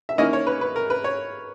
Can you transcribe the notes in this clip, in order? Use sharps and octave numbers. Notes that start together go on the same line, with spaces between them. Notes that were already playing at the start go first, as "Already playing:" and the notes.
E5
D#3 A#3 C#4 E4 D#5
C#5
B4
B4
A#4
B4
C#5